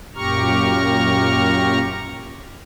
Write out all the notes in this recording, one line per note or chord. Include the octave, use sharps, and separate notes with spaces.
F#2 A#2 G4 A#5 C#6 F6